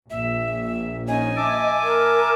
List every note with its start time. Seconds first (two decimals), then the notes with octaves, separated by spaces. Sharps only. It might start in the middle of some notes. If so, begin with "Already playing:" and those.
0.10 A#1 E5
1.08 C#4 D#4 D#5 G#5
1.37 E5 A5 D6
1.83 A#4